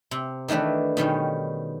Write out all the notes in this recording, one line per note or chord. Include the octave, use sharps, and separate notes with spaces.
C3
D#3 E3 A3 D4 B4
B2 D#3 G3 C#4